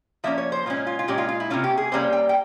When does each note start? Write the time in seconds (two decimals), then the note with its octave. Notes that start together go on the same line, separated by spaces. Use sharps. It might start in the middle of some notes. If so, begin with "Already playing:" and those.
0.24 F3 A#3 C#4 E5
0.38 C#5
0.52 C5
0.66 A#2 G#3 C#4 F4
0.87 F4
0.99 F4
1.08 A#2 G#3 C#4 G4
1.18 F4
1.29 F4
1.40 E4
1.50 C3 G3 A#3 C#4 F4
1.64 G4
1.78 G#4
1.92 C3 G3 A#3 C#4 C5
2.13 G5
2.29 G5